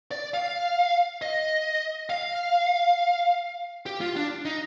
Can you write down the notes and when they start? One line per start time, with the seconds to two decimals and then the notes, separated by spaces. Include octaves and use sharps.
0.11 D5
0.34 F5
1.22 D#5
2.10 F5
3.86 G4
4.01 F4
4.16 D4
4.45 D#4